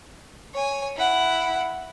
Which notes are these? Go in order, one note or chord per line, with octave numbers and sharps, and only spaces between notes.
C#5 G#5
E4 F#5